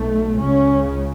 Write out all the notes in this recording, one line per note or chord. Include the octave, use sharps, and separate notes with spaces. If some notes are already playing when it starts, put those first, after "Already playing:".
Already playing: B1 B2 A3
C#2 C#3 C#4